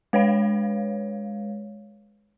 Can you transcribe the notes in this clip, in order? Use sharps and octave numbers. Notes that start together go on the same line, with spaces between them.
G#3 B4 C#5 F5